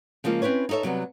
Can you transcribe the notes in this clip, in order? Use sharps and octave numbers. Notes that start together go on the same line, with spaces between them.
C#3 F3 G#3 A#3 F4
C4 C#4 E4 B4 C#5
D#4 E4 A4 C#5 E5
C3 F#3 G3 B3